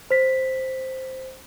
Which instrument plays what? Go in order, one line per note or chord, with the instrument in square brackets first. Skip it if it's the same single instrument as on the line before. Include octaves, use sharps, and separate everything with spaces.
[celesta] C5 B6